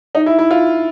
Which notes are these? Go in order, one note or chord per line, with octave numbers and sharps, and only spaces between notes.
D#4
E4
E4
F4